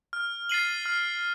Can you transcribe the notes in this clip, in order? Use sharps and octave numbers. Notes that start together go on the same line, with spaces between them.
F6
A6 C7 D#7 F#7
F6